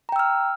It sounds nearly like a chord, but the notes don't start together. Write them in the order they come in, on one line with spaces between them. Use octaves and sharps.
A#5 G5 E6 F6